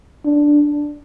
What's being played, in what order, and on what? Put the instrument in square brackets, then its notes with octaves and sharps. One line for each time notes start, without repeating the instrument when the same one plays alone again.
[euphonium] D4